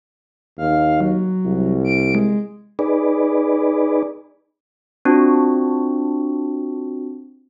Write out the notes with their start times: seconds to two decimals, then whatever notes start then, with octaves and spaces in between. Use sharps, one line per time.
0.58 D#2 F5
1.01 F#3
1.45 C2
1.85 D7
2.15 G#3
2.79 D#4 G#4 B4 D5
5.05 C4 D4 F4 F#4